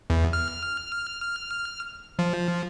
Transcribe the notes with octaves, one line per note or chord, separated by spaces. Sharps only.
E2
F6
F3